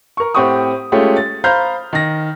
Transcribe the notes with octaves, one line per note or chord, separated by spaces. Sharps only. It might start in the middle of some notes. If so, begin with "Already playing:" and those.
A#4 C#6
A2 C4 G4 F#5 C#6 D#6
G#3 A3 C#4 F4 G4
A6
C5 F5 A#5 B5 F6 G6
D#3 A#6